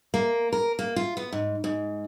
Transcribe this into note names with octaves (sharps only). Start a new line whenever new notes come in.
A#3
A#4
A#3
F4
B3
G#2
G#2